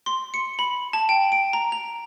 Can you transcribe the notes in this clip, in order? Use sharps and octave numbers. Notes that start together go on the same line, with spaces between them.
C6
C#7
B5
A5
G5
D7
A#5
F7